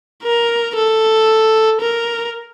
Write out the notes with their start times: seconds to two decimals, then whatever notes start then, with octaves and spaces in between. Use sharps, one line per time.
0.24 A#4
0.76 A4
1.81 A#4